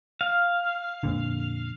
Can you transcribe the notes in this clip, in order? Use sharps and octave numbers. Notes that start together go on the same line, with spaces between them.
F5
F2 A#2 D3